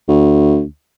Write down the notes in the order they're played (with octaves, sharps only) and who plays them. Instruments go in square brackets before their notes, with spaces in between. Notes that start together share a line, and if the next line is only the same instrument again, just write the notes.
[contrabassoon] D2